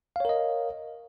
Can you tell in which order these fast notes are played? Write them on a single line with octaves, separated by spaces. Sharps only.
F5 C#5 A#4 D#5